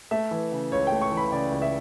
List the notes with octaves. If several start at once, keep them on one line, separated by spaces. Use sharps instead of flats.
A3 E5
E3
C#3
C#2 C#5
G5
A3
C#6
E3
B5
C#3 D5
C#2
E5